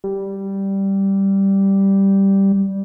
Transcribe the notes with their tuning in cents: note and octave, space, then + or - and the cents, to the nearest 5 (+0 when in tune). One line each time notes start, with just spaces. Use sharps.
G3 -5